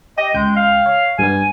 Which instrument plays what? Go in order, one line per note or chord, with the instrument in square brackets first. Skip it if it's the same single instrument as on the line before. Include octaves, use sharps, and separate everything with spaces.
[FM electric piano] G4 [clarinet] D#5
[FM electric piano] C#2 G5 G6 [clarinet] G#3
[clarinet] F5
[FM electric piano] C#5
[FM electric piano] G2 B3 [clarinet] G#5